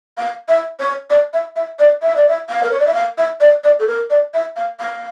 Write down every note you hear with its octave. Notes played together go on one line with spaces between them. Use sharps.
F5
E5
C#5
D5
E5
E5
D5
E5
D5
E5
F5
A#4
C#5
D5
E5
F5
E5
D5
D5
A4
A#4
D5
E5
F5
F5